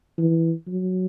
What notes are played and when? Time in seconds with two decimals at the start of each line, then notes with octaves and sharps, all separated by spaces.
0.18 E3
0.67 F#3